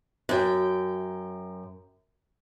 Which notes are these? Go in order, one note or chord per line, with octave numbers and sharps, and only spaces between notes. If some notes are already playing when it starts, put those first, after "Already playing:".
F#2 G5